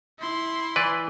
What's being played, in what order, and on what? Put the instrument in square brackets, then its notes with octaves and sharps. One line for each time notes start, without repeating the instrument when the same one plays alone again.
[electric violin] E4 C6
[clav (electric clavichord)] E3 B4 D5